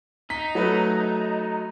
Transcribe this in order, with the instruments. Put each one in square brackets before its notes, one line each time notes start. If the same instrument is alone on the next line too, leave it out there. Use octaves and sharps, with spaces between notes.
[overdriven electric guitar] D#4 [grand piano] B6
[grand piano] F#3 A3 B4